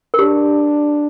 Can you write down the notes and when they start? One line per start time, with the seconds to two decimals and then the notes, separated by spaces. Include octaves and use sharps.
0.14 A#4
0.19 D4 G4